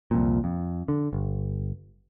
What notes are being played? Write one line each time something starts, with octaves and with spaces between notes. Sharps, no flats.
C2 F2 A#2
F2
D3
G1